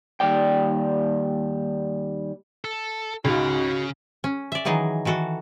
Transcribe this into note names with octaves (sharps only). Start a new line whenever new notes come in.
D#2 G3 D5 G5
A4
C#2 G#2 C#3 F#4 F5
C#4
D5 E5
D#3 E3 F#3 D#4 G#4
D#3 E3 F#4 A4